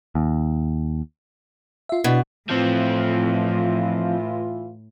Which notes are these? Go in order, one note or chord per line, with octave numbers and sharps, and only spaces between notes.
D#2
F4 E5
B2 D4 E4 B4
A2 E3 F3 C4 F4